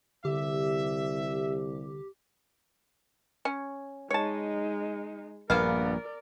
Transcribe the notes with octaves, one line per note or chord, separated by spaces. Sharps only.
C2 D3 G4 E5
C#4
G#3 D#4 C#5 A5
A#1 G2 A#3 B3 A#4 D5 F5